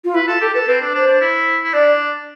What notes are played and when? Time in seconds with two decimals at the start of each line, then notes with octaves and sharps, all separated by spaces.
0.04 F4
0.14 E4 B4
0.28 F4 A4
0.41 G4 A4
0.54 A4 B4
0.67 C4 B4
0.81 D4
0.94 D4 C5
1.07 D4
1.21 E4
1.64 E4
1.74 D4 D5